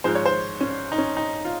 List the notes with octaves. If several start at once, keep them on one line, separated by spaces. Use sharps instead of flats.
G#2 F3 G#3 C5
C#5
C5
C#4
D#4
C#4
D#4
F4